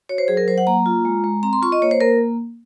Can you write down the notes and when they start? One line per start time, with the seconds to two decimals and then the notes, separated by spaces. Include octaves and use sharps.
0.09 F#4 C#5
0.18 C5
0.28 F#3 G#4
0.37 A#4
0.48 F#3 C5
0.58 F#5
0.67 A#3 A#5
0.86 F4
1.05 G#3
1.24 G#3
1.43 C4 A#5
1.53 C6
1.62 F4 C#6
1.72 D#5
1.82 A#3 C#5
1.91 C5
2.01 A#3 A#4